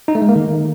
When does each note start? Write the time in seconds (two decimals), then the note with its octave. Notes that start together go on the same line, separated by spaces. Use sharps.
0.08 D#4
0.15 A3
0.22 G#3
0.29 A#3
0.36 D#3